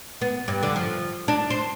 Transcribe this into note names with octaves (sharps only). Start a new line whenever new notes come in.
B3
G2
D3
F3
D4
C5